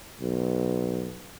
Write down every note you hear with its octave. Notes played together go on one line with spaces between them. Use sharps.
B1